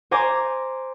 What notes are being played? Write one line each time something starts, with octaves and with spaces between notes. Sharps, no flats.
C5 G#5 A#5 D6